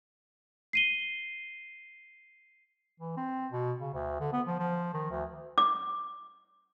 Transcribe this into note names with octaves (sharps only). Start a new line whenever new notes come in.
C7 D#7 G7
E3
C4
B2
C#3
D2
D3
B3
F3
F3
D#3
D2
D6